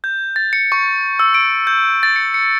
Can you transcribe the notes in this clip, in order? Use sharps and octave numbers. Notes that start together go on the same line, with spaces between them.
G6
A6
C#7
C#6
E6
D7
G6
A6
C#7
C#7